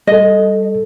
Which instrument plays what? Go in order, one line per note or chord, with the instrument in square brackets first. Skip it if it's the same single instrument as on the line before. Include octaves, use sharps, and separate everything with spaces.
[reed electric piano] G3 A4 [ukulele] D#5